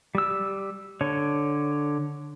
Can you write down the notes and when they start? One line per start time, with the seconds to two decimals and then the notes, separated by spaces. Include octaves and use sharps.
0.15 G3 E6
1.01 D3 C#5